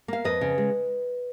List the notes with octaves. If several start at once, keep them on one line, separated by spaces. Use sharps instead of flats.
A#3 F5
F2 B4 D#5
C#3
G#3